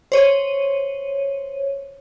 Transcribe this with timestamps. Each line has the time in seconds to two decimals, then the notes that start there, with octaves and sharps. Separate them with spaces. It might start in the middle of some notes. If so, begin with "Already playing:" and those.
0.12 C5 C#5 D#7